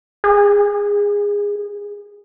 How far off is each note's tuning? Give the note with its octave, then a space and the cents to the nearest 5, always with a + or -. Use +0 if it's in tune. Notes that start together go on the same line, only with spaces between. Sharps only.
G#4 -20